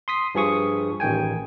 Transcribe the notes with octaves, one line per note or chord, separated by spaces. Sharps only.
C6 D#6 B6
G2 F3 G#4 C#6 D#6
A1 D#3 G5 G#5